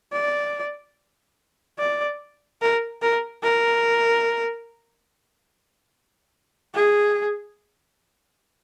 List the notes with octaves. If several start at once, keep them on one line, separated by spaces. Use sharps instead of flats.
D5
D5
A#4
A#4
A#4
G#4